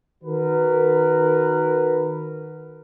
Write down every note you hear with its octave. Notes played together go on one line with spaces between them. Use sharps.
D#3 F#4 A#4 B4